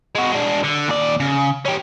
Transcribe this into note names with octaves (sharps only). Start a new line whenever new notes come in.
G#3 F#4
G#3 D4
D3
D#2 D5
C#3
C#4 G4